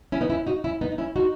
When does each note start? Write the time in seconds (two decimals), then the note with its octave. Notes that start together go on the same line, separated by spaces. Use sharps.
0.12 C#4 E4
0.21 B3 D#4
0.29 C#4 E4
0.47 D#4 F#4
0.64 C#4 E4
0.81 B3 D#4
0.92 D#4
0.98 C#4 E4
1.16 D#4 F#4